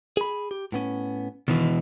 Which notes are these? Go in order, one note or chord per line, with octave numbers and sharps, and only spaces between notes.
G#4 B5
G4
A2 B3 C#4
B2 D#3 E3